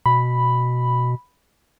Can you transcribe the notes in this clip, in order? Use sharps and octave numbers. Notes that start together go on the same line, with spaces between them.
B2 B5